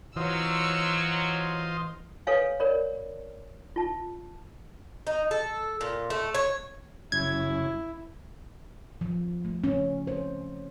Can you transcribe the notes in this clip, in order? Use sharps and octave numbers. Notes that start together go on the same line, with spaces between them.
E3 F#3 F4 C5 D#5 E6
A4 B4 C#5 F5 G#5
A#4 C#5 D5 B5
F4 A5
D#4
A4
A#2
A3
C#5
F#2 C#3 E4 G#6
F3
A3
C#4
C5